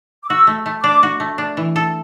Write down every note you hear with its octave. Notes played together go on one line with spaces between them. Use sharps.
D6
F#4 E6
A3
A3
D4 D6
F#4
A3
D4
E3
A4